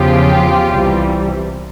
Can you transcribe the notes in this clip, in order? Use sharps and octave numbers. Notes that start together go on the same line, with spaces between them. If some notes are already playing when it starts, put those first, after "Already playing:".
Already playing: E2 C#3 F3 F4 G4
C2 C3 E3 G3